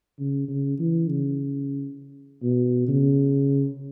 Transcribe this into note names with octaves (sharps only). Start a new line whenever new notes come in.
C#3
C#3
E3
C#3
B2
C#3